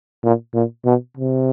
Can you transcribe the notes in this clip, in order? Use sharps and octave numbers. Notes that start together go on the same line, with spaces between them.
A#2
A#2
B2
C3